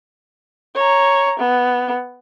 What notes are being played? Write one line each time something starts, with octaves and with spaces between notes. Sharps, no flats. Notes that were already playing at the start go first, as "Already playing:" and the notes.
C#5 A#5
B3